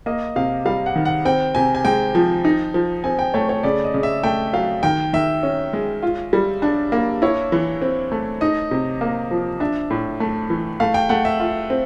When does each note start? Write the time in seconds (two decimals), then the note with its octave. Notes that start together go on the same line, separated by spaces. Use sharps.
0.06 A#3 D#5
0.36 C3 F5
0.65 G3 F5
0.86 F#5
0.96 D#3
1.05 F#5
1.25 C4 G5
1.55 C3 G#5
1.75 G#5
1.85 G#3 G5
2.15 F3
2.45 D#4
2.74 F3
3.04 C4 G#5
3.19 G5
3.34 A3 C#5
3.49 C#5
3.63 C#3 D5
3.84 D#5
3.94 C#3
4.03 E5
4.23 A3 G5
4.53 F#3 F5
4.83 D#3 G5
5.13 D#3 E5
5.43 C#4
5.73 G#3
6.03 F4
6.33 G3
6.62 D4
6.92 A#3
7.22 E4 C#5
7.52 E3
7.82 C4
8.12 A3
8.41 D#4 D#5
8.71 C3
9.01 A#3
9.31 F3
9.60 D4 E5
9.90 A2
10.20 A3
10.50 E3
10.80 A3 F5
10.94 G5
11.09 A3 F#5
11.25 E5
11.40 F4
11.70 C4